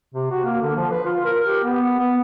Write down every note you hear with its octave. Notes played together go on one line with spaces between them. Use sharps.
C3
F#4
A#3
D3
F3
B4
F4
A#4
G4
B3
B3